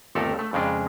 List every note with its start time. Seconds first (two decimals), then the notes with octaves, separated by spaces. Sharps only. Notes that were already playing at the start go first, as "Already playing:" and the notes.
0.15 G1 D#2 C3 A3 A4 A#4
0.39 A3
0.53 F2 C#3 G#3 D4